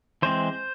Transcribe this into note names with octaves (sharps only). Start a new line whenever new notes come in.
E3 G#3 C4 C5